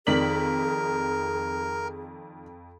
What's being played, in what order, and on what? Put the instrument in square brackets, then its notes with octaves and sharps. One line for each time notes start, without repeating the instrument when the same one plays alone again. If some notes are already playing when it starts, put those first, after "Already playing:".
[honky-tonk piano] F2 B6 F#7 [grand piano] D#3 D5 [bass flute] G#4 [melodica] A#4